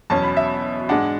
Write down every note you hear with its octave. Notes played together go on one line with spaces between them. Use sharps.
E2 B2 F#3 C#4 A5
B5
E5
G#2 G#3 D4 F#5